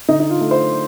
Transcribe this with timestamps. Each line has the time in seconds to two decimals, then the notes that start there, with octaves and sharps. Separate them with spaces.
0.09 D3 D#4
0.20 D#4
0.30 F4
0.41 A3
0.51 C5